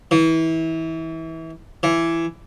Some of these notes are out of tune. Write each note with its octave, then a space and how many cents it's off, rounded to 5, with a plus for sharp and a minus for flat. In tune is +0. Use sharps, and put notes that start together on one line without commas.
E3 -25
E3 +15